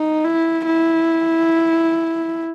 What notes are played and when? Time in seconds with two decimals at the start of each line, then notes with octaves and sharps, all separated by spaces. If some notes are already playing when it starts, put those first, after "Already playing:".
Already playing: D#4
0.25 E4
0.66 E4